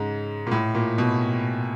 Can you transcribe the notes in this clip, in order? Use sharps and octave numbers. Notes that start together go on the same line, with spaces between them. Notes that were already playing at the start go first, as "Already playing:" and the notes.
Already playing: G#2 C#3
A#2
A2
A#2
B2